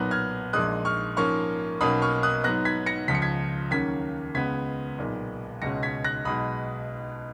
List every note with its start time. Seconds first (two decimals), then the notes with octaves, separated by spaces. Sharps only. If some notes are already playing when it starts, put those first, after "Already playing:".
Already playing: B1 A#2 F#3 B3 F#6 A#6
0.11 F6 G#6
0.53 A#1 A#2 G#3 D#6 F#6
0.85 C#6 F6
1.17 G#2 F3 A#3 C#4 C#6 F6
1.81 B1 B2 A#3 C#4 B5 D#6
2.02 C#6 F6
2.23 D#6 F#6
2.44 G#2 F#3 B3 F#6 A#6
2.65 G#6 B6
2.86 A#6 C#7
3.08 C#2 C#3 F3 B6
3.15 C#7
3.22 G#6 B6
3.71 D#2 C#3 F#3 A#3 C#4 G#6 B6
4.35 C#2 C#3 G#3 B3 G#6 B6
4.98 B1 A#2 G#3 B3
5.62 C#2 B2 G#3 C#4 A#6 C#7
5.83 G#6 B6
6.04 F#6 A#6
6.25 B1 B2 G#3 B5 D#6